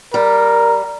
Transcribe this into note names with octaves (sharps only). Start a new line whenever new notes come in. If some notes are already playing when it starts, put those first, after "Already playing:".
G3 A#4